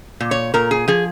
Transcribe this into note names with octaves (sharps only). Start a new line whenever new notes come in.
A#2
C#5
A#2 A#4
G#4
F3 G#4